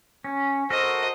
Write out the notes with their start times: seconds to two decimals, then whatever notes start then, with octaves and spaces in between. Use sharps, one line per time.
0.24 C#4
0.70 F#4 A4 A#4 C5 D#5